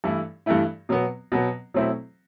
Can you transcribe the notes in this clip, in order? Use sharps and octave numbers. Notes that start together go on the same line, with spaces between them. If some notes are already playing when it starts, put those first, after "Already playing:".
G2 E3 A3 E4
G2 E3 A3 E4
B2 F#3 B3
B2 F#3 B3
B2 F#3 A3 C4 E4